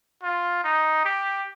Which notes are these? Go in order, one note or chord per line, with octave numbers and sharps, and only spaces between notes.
F4
D#4
G4